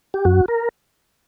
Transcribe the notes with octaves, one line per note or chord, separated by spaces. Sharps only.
G4
F#2 F#4
A#4